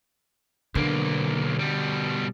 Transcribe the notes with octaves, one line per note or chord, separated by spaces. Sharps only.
B1 D3 A#3
B2 G3